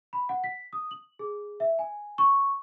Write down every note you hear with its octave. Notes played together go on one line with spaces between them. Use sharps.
B5
F#5
B6
D#6
F#7
G#4
E5
G#5
C#6